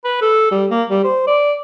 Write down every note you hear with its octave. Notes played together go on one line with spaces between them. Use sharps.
B4
A4
G3
A#3
G3
C5
D5